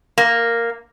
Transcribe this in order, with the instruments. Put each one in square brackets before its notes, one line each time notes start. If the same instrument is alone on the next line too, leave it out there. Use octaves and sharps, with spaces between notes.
[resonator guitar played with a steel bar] A#3